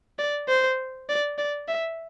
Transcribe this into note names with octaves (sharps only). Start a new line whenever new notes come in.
D5
C5
D5
D5
E5